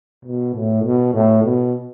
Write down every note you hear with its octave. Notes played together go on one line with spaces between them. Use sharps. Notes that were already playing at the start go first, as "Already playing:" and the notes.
B2
A2
B2
A2
B2